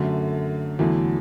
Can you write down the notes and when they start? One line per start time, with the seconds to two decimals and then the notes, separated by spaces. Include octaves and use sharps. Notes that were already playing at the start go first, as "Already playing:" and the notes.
Already playing: F#2 D3 A3
0.79 E2 D3 F#3 A3 E4